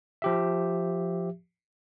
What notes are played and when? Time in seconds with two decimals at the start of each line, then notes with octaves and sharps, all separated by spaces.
0.22 F3 G4 E5